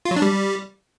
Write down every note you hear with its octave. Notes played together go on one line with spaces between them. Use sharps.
F4
F#3
D4
G3